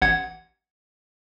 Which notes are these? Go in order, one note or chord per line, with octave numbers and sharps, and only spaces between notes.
A1 F#5 G#6